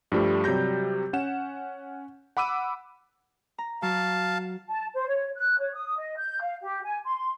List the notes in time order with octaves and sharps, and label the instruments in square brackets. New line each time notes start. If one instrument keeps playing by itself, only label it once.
[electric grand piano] G2 F3 G3 A3
C3 F#3 G3 G6 A#6
C#4 F#5 E7
F#5 B5 D6 E6 D#7
[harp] A#5
[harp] F#3 [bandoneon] F5 A5
[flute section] A5
C5
C#5
F#6
C#5
D#6
D#5
G6
F5
G4
G#5
C6